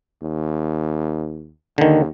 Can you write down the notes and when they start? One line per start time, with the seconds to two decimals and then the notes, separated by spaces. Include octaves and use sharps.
0.22 D#2
1.78 D#2 D3 D#3